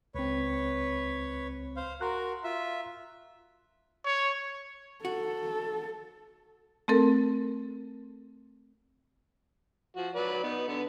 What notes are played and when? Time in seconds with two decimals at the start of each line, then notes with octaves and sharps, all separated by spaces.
0.15 C#2 C4 B4 C#5
1.76 C5 F5
2.01 F#4 A#4 A#5 C6 F#6
2.44 F4 E5
4.05 C#5
5.05 F#4 A4
6.88 A3 C4 A4 A#4
9.96 F3 F#4
10.15 F#3 B4 D5
10.43 B3 D#4
10.68 D3 B3